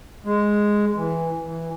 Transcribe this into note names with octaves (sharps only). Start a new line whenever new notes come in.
G#3
E3
E3